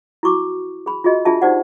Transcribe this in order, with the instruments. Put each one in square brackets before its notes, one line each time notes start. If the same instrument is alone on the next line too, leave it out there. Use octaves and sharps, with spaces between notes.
[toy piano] E4 F#4 C#6 D6
G#4 B5
F4 F#4 G#4 D#5
D4 F4 G#4 E5 A5
D#4 G4 C5 D5 F#5